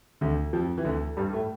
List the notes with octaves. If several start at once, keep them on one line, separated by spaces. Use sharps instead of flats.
D2 D3
F2 F3
E3
D2 D3
G2 G3
A2 A3